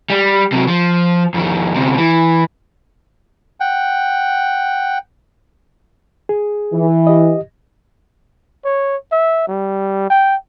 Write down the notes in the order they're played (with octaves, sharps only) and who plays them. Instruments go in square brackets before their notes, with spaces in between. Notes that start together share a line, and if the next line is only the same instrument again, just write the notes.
[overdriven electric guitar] G3
C3 F#3
F3
F2 D#3
D2 C3
E3
[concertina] F#5 G5
[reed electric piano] G#4
[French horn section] E3
[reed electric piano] G4 D#5
[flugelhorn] C#5
E5
G3
G5